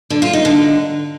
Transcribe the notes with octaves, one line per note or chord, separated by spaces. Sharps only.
D3
F4
D#4
D3